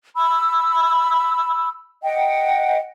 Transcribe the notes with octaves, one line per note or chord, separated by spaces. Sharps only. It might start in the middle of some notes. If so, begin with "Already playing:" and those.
B5 E6
D#5 F#5 G5